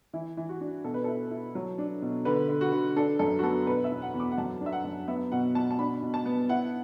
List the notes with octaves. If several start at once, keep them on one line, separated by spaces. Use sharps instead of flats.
E3 E4
E3
F#4
D4
B2 A4
B4
E4 A4
E4
F#3
D4
B2
D3 B4
D3
F#4
D3
D4 A4
F#2 A4
F#4
B3 A4
B2 B4
E5
E2
F#5
E2
D6
F#5
F#2 A5
D4
E5
F#5
F#2
B3 E5
B2 F#5
B2 A5
A5
D4 B5
B2
A5
B3
E4 F#5